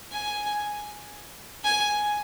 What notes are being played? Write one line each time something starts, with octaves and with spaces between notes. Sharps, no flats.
G#5
G#5